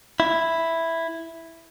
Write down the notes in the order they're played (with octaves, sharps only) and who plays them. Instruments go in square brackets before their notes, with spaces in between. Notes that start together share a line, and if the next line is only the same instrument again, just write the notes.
[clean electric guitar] E4